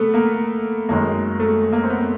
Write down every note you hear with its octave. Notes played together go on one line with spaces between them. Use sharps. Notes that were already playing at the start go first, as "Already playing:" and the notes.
Already playing: C3 A3 B3
A#3
F#2 D#3 G#3 A#3
A3
A#3
C4
B3